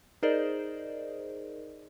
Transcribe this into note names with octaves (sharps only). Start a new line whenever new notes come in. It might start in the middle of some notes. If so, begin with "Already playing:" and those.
D#4 G#4 A#4 C5 D5 D#5